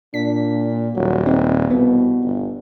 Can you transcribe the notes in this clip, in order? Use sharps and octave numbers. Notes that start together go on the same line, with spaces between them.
A#2 D4 B6
D#1 F#3
C4 D#4
C2 B2 B3
G1